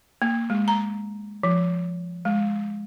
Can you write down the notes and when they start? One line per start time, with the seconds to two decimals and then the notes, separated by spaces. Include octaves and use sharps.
0.22 A#3
0.50 G#3
0.68 A#5
1.43 F3
2.25 G#3